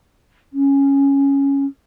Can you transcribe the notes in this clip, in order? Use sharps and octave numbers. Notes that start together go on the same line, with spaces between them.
C#4